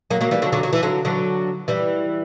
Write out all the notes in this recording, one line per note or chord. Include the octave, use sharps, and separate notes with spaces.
F#3 A#3
F#3 A#3
E3 G3
D3 F#3
D3 F#3
F#3
E3
D3 F#3
D3 F#3
E3 G3